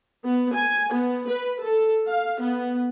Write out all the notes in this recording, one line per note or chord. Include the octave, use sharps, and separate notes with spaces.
B3
G#5
B3
B4
A4
F5
B3